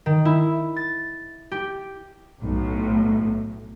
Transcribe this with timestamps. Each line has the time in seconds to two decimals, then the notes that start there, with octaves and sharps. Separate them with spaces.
0.06 D#3
0.25 E4
0.76 A6
1.52 G4
2.42 B1 A2